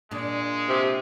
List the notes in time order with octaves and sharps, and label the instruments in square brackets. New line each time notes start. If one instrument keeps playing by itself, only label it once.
[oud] A#2 D4 [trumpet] G#3
[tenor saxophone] C3